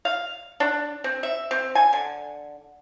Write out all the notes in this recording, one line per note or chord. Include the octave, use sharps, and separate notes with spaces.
F5
D4
C4
E5
C4
G#5
D3